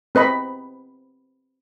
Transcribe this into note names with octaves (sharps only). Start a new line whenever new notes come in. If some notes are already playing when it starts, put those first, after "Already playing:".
C4 B4 D#5 B5